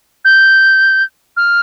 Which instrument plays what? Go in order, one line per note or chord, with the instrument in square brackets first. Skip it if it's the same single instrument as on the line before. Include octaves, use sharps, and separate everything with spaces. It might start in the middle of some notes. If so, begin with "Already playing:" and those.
[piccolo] G6
F6